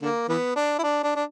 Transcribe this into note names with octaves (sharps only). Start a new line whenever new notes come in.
D3 A#3
E3 B3
D4
E4
D4
D4
D4